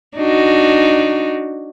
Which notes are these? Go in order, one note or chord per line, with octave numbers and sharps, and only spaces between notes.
D4 D#4 F#4